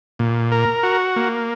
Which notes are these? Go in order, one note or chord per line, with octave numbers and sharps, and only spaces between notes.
A#2
A#4
F#4
A#3